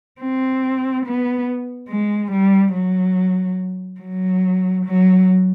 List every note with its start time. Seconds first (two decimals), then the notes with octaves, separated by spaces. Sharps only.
0.21 C4
1.06 B3
1.89 G#3
2.32 G3
2.74 F#3
4.01 F#3
4.86 F#3